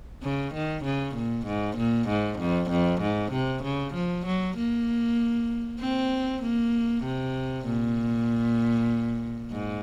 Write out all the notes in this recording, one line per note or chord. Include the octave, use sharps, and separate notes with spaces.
C#3
D#3
C#3
A#2
G#2
A#2
G#2
F2
F2
G#2
C3
C#3
F3
F#3
A#3
C4
A#3
C3
A#2
G#2